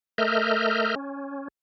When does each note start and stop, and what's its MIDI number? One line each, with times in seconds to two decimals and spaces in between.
0.18 0.95 57
0.18 0.95 70
0.18 0.95 75
0.18 0.95 76
0.18 0.95 89
0.18 0.95 91
0.96 1.48 61